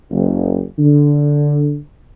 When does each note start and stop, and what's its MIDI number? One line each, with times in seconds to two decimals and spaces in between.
0.11 0.62 30
0.79 1.77 50